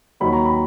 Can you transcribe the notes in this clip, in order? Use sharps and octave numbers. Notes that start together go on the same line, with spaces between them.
D#2 D#3 F#3 B5
A#5
B5